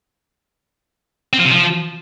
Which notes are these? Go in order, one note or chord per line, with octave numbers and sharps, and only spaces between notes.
C4
F3
C3
F3